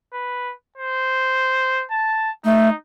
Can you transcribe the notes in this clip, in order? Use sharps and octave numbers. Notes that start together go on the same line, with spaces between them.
B4
C5
A5
A3 D#4